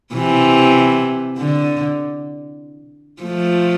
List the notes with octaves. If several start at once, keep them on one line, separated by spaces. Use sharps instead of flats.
C3 E3
D3
F3 A3